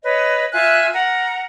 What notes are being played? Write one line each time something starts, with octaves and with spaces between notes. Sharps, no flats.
B4 C#5 D#5
F4 E5 G#5 F#6
A#4 F#5 A#5